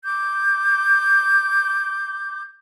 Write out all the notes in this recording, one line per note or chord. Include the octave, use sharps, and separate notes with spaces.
D6 G6